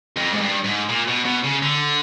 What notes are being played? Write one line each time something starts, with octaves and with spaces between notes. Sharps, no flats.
F2
G#2
G2
G#2
A#2
B2
B2
C#3
D3